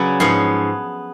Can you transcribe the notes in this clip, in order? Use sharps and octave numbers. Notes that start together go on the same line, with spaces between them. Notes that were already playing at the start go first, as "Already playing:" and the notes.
Already playing: C#3 F#3 C#4 B4 D5
G#2 F3 B3 C#5 F5